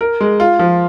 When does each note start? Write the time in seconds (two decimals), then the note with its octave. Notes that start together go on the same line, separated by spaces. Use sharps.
0.01 A#4
0.20 G#3
0.40 F4
0.59 F3